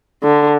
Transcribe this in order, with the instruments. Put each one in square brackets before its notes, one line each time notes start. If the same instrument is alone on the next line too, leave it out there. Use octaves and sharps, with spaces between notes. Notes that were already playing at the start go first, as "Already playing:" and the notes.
[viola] D3